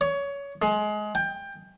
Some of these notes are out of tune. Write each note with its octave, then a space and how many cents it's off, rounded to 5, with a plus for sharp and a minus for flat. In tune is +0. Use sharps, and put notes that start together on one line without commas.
C#5 +20
G#3 +25
G5 +20